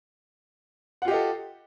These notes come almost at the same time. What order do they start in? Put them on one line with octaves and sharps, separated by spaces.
F#5 F4 G4 D#5 A4